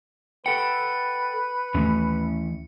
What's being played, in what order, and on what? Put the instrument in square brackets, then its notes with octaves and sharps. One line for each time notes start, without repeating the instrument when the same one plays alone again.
[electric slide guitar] A4 F#5 G5 [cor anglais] B4 [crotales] C#7
[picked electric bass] D#2 A3 [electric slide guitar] E3 C#4